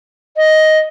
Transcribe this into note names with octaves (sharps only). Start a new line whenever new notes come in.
D#5